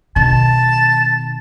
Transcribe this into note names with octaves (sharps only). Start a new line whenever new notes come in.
B2 D#3 A5